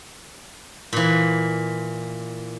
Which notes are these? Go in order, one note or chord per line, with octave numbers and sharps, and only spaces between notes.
A#2 E3